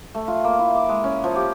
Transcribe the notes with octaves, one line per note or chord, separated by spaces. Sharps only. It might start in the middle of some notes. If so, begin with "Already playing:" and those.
A3
F4
A#3
E4
D6
G#3
C#4
F3
G4